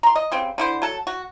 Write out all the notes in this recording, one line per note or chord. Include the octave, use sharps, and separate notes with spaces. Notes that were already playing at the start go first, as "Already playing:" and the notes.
A#5 C6
D#5
C#3 G3 C4
D3 E4 C5
F#3 A4
F#4